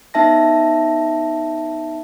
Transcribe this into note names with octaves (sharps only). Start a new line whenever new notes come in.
B3 D#4 E5 A5 A#6